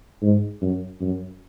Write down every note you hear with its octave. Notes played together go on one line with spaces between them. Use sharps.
G#2
F#2
F#2